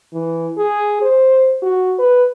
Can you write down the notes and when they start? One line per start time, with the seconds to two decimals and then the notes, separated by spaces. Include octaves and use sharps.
0.13 E3
0.57 G#4
1.02 C5
1.62 F#4
1.99 B4